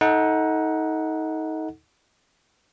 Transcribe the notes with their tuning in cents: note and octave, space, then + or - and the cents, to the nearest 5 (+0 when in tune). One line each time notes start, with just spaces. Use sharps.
D#4 +25 A4 +0 F#5 -5